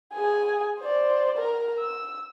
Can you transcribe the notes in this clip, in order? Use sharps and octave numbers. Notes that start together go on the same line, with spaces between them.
G#4 G#5
C5 D5
A#4
E6